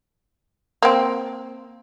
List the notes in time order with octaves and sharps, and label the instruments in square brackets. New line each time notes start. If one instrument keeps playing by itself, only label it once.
[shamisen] A#3 C4